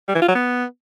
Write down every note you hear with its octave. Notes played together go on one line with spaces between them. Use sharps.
G3
E3
F4
F#3
B3